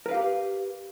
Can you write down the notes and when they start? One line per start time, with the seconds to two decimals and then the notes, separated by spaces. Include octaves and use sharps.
0.06 A#4
0.09 B4
0.11 F5
0.14 G4